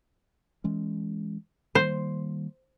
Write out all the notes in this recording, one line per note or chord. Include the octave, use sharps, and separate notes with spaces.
E3 G#3 C#4
D#3 G3 A#3 C5